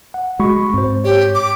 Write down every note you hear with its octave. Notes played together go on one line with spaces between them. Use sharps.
F#5
G#3 F#4 B5 C#6
G#2 C4 C5
G4 C#5
D6